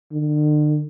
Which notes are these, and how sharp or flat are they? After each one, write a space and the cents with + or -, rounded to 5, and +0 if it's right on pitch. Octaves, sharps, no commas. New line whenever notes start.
D3 +40